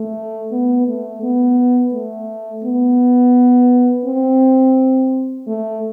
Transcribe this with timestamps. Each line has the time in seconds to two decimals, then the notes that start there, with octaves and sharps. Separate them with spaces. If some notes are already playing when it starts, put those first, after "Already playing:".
Already playing: A3
0.52 B3
0.88 A3
1.23 B3
1.93 A3
2.64 B3
4.06 C4
5.47 A3